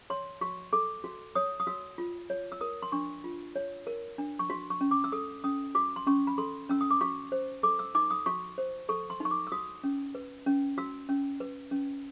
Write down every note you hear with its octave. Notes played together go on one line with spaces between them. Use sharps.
C#5 C6
F#4 C#6
A4 D6
F#4
C#5 D#6
D#6
F#4 E6
F4
C#5
E6
A#4 D#6
C6
D4 C#6
F4
C#5
A#4
D4
C#6
F#4 C6
C#6
C#4
D6
E6
A4 D#6
C#4 D#6
F#4 D6
C6
C#4 C#6
B5
A4 C6
C#4 E6
D#6
D6
F#4 C#6
C5
A4 D6
E6
D#4 D6
D#6
F#4 C#6
C5
A4 C#6
C6
D#4 C#6
D6
E6
F#4 D#6
C#4
B4
C#4
F#4 E6
C#4
B4
C#4